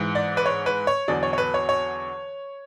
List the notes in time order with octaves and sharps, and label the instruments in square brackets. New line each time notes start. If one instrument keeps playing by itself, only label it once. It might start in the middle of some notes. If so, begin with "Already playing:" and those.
Already playing: [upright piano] G#2 E3
D5
B4
C#5
B4
C#5
E2 D3 F#3 D5
C#5
C#5
B4
C#5
C#5